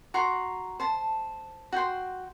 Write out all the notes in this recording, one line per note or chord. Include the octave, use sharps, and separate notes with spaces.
F#4 A#5 C6
C5 A5
F#4 G5 C6